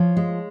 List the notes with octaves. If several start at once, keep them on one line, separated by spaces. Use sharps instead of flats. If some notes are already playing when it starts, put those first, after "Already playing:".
Already playing: F3 C#5 F5
G#3